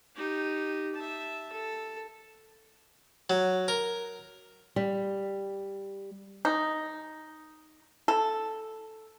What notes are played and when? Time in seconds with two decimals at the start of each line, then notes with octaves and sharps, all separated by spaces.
0.15 D#4 G4
0.94 E5 A5
1.52 A4
3.30 F#3
3.68 A#4
4.76 G3
6.45 D#4
8.08 A4